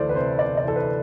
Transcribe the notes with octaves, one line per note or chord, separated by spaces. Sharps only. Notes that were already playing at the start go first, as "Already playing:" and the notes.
Already playing: D2 E3 A4 C5 D5
B4
C3 C5
C3 D5
D5
E3 A4
B4